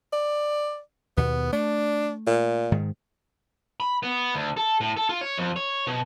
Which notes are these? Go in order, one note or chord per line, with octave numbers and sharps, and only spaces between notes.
D5
D#2 B2 B3
A3 D4
A#2
G#2 D#3
B5
B3
D2
A4
A2
A4
F4
C#5
F2
C#5
B2